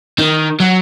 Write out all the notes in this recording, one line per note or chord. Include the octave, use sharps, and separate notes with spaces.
D#3
F#3